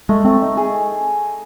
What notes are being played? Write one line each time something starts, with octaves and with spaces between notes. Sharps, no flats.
G#3 A3
A3 C4
D#4
G#4